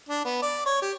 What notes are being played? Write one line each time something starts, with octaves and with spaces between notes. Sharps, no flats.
D4
B3
D5
C#5
G4